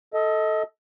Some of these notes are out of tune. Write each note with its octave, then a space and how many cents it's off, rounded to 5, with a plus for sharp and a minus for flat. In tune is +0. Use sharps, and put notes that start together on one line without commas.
A4 +0 D#5 +25